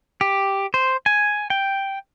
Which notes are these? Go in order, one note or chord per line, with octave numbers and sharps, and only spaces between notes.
G4
C5
G#5
G5